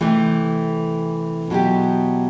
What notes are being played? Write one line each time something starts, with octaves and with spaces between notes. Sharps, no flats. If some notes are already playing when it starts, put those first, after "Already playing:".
C3 E3 A3
B2 F#3 B3 E4 G4